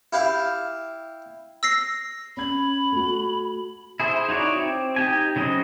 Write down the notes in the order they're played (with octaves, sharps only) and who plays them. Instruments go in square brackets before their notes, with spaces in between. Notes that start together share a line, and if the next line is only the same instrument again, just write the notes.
[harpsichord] E4 G4 F5
[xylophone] E6 A#6 C7
[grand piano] C#4 G#6 [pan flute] B5
[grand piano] A3 F#4
[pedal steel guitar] E4 G#4 C5 E5
D#4 E4 F#4 C#5 D5
C4
D#4 G4 G#5
C#3 F#3 C4 D#5